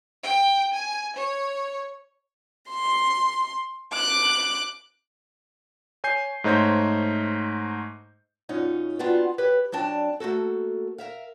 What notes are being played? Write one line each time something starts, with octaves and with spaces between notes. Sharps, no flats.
G5
G#5
C#5
C6
D6 F#6
C#5 G#5 G6 C7
G#2 A3 D#4 C5 C#5 G6
F#2 C#4 D#4 F4
B3 C4 D4 D#4 F4 F#4
G4 B4 C#5
F#3 C4 D4 A5
A3 A#3 F#4 A4
A#4 E5 F5